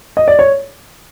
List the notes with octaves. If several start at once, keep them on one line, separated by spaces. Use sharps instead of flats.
D#5
D5
C#5